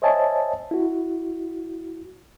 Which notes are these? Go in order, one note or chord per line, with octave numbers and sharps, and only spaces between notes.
C5 C#5 D#5 E5 G#5 A5
E4 F#4